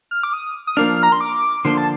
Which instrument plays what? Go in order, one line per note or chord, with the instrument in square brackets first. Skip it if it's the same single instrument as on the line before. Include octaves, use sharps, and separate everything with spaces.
[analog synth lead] F6
D6
D#6
D#6
[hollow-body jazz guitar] F3 A#3 D4 [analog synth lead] F6
[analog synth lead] A#5
C6
D6
[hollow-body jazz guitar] D3 F3 A#3 D4 [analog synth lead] C6
[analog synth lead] A5